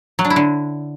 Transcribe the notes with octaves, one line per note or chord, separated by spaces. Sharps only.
F#3
D4
E4
D3